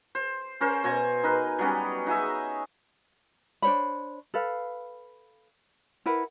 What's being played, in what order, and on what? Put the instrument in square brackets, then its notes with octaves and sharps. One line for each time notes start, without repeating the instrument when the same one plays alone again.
[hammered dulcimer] C5
C#4 A#4 C5
B2 C5 G#5 A#5
D#4 A#4 B4
F#3 G3 B3 C#4
D#4 F#4 G#4 E5
[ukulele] D4 C5 C#5 B5
A4 B4 F5
E4 A#4 B4 F#5